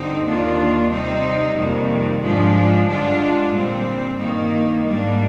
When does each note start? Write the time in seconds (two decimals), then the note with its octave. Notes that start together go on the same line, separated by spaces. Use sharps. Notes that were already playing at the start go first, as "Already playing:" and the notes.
Already playing: G2 D3 C4 D#4
0.25 D#2 D#3 A#3 D4 F4
0.90 C3 G3 C4 D#4
1.56 F2 C3 D#3 G3 A#3
2.21 G#2 F3 G#3 D4 F4
2.87 G2 D3 G#3 D4 F4
3.52 A#2 G3 C4
4.18 G2 D#3 A#3 D#4
4.83 G#2 G3 A#3 D4